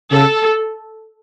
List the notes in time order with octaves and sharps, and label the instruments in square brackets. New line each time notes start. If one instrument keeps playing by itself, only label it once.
[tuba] C#3 [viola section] A4